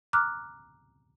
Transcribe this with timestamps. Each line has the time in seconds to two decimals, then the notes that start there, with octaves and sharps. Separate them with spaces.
0.13 A#5 D6 F6 F#6